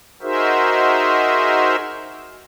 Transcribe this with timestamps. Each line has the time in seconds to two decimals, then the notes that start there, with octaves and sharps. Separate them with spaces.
0.22 D#4 F#4 G#4 A#4 C5 E5